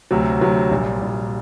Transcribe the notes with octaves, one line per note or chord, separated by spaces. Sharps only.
D2 C3 F#3
D2 C3 F#3
A#1 A#2 G3
A#1 A#2 G3